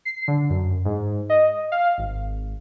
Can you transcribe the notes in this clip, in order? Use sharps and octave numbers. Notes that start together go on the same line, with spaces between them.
C7
D3
F#2
G#2
D#5
F5
G#1